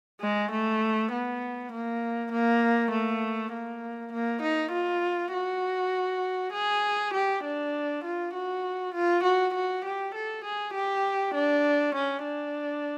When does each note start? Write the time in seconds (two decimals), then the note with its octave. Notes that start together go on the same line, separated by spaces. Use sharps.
0.21 G#3
0.51 A3
1.12 B3
1.72 A#3
2.32 A#3
2.92 A3
3.52 A#3
4.13 A#3
4.42 D#4
4.72 F4
5.33 F#4
6.52 G#4
7.14 G4
7.44 D4
8.04 F4
8.33 F#4
8.94 F4
9.23 F#4
9.54 F#4
9.85 G4
10.14 A4
10.44 G#4
10.74 G4
11.34 D4
11.95 C#4
12.24 D4